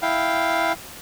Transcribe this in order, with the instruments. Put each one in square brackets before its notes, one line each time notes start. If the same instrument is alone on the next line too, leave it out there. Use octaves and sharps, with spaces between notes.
[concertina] E4 F5 G5